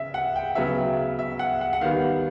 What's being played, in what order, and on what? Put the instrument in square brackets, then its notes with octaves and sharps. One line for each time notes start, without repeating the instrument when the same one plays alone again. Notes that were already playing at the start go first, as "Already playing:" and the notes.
Already playing: [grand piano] C#3 E5
F#5
G5
C#3 F#3 B3 E5
E5
F#5
F#5
F#5
D#3 G3 B3 F5